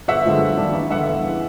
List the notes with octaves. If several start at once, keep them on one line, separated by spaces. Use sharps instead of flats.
G1 E5 F#5
F#2 D3 F3 G#3
F#2
D#3 G3 A#3 D4
A1
G2 D3 E5 F#5
E2
C#3
E3